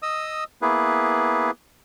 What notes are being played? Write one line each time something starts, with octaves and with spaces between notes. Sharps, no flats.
D#5 D#6 E6
A#3 B3 E4 G#4 B4